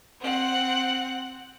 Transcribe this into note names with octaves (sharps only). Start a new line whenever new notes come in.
C4 F#5